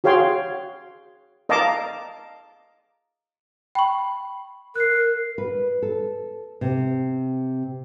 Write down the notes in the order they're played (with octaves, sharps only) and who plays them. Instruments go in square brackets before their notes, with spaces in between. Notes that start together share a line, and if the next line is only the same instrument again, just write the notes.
[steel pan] F#4 G#4 C#5 F5 G5 C6
A#4 D#5 F5 A5 A#5 D6
[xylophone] G5 C#6 [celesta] B5
[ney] A#4 [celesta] F#6 C7
[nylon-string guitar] B4
A4
C3